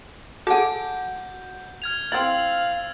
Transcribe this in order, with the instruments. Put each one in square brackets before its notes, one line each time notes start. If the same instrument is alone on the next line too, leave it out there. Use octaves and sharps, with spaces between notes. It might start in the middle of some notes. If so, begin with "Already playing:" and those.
[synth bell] F#4 F#5 [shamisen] G#4 A4 [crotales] G6
[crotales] F6 G#6 F7
[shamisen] C4 E4 [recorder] F5 [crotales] E6 A6 [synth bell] F#7